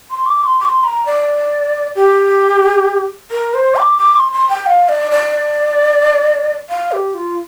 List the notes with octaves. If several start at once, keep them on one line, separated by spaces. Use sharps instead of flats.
C6
D6
C6
D6
C6
A#5
D5
G4
A#4
C5
D6
D6
C6
C6
G5
F5
D5
D5
F5
G4
F4